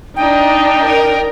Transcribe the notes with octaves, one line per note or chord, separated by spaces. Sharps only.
D4 D#4 G5
A#4